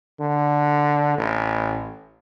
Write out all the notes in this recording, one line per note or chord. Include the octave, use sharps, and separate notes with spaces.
D3
A1